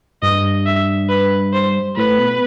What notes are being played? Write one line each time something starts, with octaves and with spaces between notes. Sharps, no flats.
G2 D#5
E5
B4
C5
A2 B4
B2